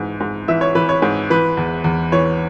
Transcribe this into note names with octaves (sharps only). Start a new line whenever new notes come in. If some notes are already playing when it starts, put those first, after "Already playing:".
Already playing: G#2 E3
G#2
E3 E5
C#5
E3 B4
C#5
G#2
E3 B4
E2
E2
E3 C#5